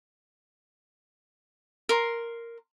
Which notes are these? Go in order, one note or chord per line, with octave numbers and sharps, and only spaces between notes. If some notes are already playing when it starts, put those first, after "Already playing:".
A#4 C6